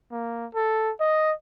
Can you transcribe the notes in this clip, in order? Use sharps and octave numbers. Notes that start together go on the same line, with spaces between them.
A#3
A4
D#5